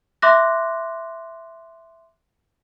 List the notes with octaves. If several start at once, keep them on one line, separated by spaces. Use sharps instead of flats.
E5 C6 D6 F#6 A#6